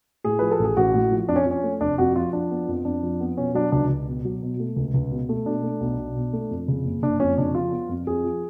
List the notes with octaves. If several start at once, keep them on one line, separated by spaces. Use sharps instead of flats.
A2 G#4
F3 B4
A4
A1 G#4
A1 F#4
A2
F3
F2 D4
C#4
F3
C#4
A3
F1 D4
F2 F#4
F3 F4
F3 D4
B3
F2
F2 D4
F3
B3
B2 C#4
F#3 D4
C#2 D4
C#2
B2
F#3
B2
A3
C#2
C#2
B2
A3
B2 D4
A3
B1
B1
B2
A3
F2
C#3
F#1
F#1 D4
F2 C#4
C#3 D4
F3 F4
B3
F2
F2 G#4
F3